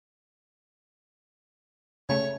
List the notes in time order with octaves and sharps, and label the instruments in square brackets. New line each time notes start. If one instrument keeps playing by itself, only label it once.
[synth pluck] C#3 A3 [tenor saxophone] C#5